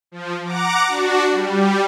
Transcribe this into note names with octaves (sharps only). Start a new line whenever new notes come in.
F3
F#5 A#5 D6
D4 F#4
G3